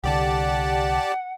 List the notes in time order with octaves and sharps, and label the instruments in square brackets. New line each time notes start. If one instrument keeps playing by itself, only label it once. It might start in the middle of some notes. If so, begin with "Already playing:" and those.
[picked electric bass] C2 D3 [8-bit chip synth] G4 D5 A5 [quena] F#5